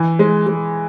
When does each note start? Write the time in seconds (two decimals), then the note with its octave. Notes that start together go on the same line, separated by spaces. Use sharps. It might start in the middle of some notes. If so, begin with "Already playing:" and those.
Already playing: E3
0.19 G#3
0.47 G#3